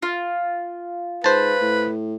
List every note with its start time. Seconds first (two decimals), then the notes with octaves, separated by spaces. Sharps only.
0.02 F4
1.24 G#2 B4 C5 A5
1.61 A2